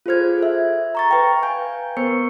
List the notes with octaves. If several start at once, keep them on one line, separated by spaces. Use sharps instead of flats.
F4 G#4 A4 C5 F6 G#6
A4 E5
A#5 C#6 A6
B4 G5 A#6
F5 G#5 G6
B3 A#4 C5 C#6 C#7